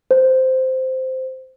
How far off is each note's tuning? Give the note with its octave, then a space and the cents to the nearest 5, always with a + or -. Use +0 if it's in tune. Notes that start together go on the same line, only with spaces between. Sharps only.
C5 -10